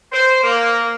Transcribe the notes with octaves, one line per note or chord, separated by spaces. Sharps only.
C5
A#3